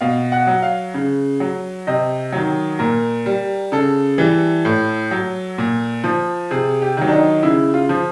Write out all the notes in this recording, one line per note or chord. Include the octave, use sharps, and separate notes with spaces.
B2 F5
F#5
F#3
F5
C#3
F#3
C3 D#5
D#3 F#3
A#2 A#4
G3
C#3 A4
E3 G3
A2
F#3
A#2
F3
C3 G#4
G4
D#3 F#3
D4
D#4
C#3 E4
F4
F3